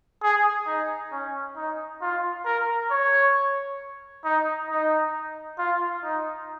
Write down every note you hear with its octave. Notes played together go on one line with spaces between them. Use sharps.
G#4
D#4
C#4
D#4
F4
A#4
C#5
D#4
D#4
F4
D#4